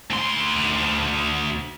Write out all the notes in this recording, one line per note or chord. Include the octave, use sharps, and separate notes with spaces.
D2 C6